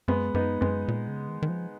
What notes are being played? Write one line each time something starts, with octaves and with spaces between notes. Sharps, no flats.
F#2 G#3 B3
F#2 B3 D#4
F#2 G#3 B3
A#2
C#3
D#3
D#3
F3